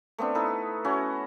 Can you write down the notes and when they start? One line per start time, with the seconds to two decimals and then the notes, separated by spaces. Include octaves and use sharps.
0.18 A3 B3 C4 D4
0.35 D#4 E4 A4 B4
0.84 C#4 E4 F#4 C#5